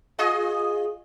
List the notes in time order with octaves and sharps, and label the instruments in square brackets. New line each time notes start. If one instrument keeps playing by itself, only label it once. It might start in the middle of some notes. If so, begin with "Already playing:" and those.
[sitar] F4 G#4 D#5